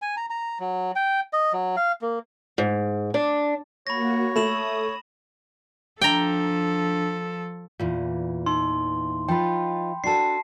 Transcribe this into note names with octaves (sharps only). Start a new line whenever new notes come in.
G#5
A#5
A#5
F#3
G5
D#5
F#3
F5
A#3
G#2
D4
A#3 F#4 C#5 B5 A#6
A3 B5 D#6 E7 F#7
F3 D4 A4 G5 A#5
E2 A#2 E3 F4
D#4 C6
F3 D#4 F4 G5 B5
D4 F#4 A4 A5 C7